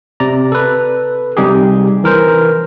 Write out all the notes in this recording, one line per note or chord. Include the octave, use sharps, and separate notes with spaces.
C3 D5 A#5
A4 B4
C3 G3 D#4 G4 G#4
E3 A#4 C5